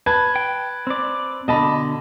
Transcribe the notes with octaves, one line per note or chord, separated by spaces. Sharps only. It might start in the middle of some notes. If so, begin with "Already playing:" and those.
B4 A5 G#6
G5
C4 D5
B2 D3 D#5 A5 B5